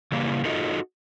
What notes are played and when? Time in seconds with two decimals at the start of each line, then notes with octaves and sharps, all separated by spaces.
0.12 C#3 E3 G3 A#3
0.45 D#4 F4 F#4 G#4 A4 D#5